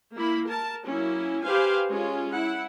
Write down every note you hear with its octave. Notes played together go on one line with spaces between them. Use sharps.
A#3 E4 B5
A#4 A5
F#3 A#3 C#4 E4
G4 B4 C5 F5 G#5
G#3 C#4 F4
E4 F#5